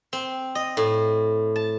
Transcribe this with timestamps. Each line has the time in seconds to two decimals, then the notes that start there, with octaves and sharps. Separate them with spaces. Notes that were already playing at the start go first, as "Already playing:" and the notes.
0.13 C4
0.55 D#5
0.77 A2
1.56 A5